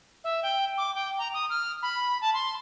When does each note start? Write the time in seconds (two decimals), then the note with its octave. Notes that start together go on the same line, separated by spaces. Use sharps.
0.24 E5
0.43 G5
0.78 D6
0.95 G5
1.19 A#5
1.34 D#6
1.50 F6
1.83 B5
2.21 A5
2.34 C6